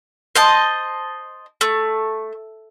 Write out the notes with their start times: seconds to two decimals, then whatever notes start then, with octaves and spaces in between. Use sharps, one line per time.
0.35 C5 D#5 A5
1.61 A3